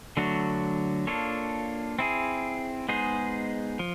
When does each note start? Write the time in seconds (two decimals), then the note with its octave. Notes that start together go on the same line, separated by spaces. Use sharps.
0.17 D3 F#3 A3 D4 F#4
1.07 A#3 D4 F4 A4 C#5
1.99 C4 E4 G#4
2.89 G#3 B3 D#4 G#4 C5
3.79 F3